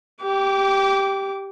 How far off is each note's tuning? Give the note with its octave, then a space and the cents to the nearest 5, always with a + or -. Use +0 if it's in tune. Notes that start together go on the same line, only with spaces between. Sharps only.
G4 +0 D6 -25